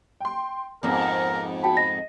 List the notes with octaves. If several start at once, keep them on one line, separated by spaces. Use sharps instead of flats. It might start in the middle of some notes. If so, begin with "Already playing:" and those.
G5 C6
F2 G#2 B3 A#4
F#4 G5 A5 B5
D#5 A#6